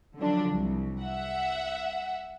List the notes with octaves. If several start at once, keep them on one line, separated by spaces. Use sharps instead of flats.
D3 F3 F#3 D4
C2
E5 F#5